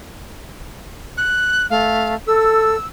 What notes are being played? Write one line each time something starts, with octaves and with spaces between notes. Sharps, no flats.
F#6
A3 F5
A4 E6